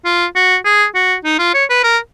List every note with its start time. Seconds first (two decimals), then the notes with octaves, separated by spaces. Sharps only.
0.05 F4
0.35 F#4
0.65 G#4
0.95 F#4
1.24 D#4
1.39 F4
1.54 C#5
1.69 B4
1.84 A#4